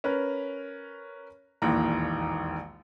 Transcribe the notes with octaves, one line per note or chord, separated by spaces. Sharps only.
C#4 A#4 B4
E1 A#1 D#2 D#3 E3 A#5